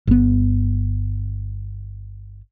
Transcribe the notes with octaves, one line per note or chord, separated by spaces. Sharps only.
G1 B3